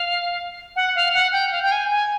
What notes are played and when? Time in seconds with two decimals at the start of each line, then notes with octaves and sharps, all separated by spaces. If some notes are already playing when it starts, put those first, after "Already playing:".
Already playing: F5
0.76 F#5
0.95 F5
1.14 F#5
1.32 G5
1.51 F5
1.62 G5
1.71 G#5
1.90 G#5